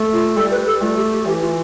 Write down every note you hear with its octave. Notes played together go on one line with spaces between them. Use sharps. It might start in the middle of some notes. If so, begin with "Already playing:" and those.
Already playing: A3
F4
G3 A4
B4
A4
A3 F4
G4
G4
E3 G4
F4